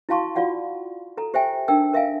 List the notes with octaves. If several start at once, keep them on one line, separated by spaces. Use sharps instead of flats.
E4 F#4 F5 A5 C6 C#6
F4 F#4 D5 F5 F#5
A4 A#5
G4 C5 E5 G5 G#5
D4 D#4 A#4 G5 E6
A#4 E5 F5 G#5